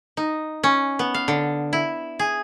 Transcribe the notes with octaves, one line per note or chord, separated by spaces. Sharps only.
D#4
C#4
B3
F5
D3
E4
G#4